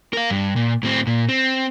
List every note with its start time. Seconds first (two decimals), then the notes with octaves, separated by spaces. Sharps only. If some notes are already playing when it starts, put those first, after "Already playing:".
0.13 A#4 F5
0.30 G2
0.56 A#2
0.83 A2 C4
1.07 A#2
1.29 C4